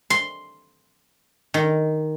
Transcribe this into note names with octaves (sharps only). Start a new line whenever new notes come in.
C6
D#3